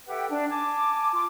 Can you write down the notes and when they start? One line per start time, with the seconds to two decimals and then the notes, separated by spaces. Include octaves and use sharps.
0.08 G4 A4 B4 E5 F#5 G5
0.31 D4
0.51 G#5 A5 D6
1.13 F4 D6